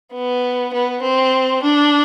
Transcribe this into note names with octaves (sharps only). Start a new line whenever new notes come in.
B3
B3
C4
D4